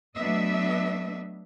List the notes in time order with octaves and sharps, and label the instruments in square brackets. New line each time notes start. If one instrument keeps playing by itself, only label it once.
[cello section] F#3 A3 B3 D4 D#5 E5